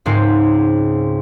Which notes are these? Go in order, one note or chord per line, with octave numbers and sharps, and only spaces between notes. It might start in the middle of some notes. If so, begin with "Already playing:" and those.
C#2 G#2 C4 C5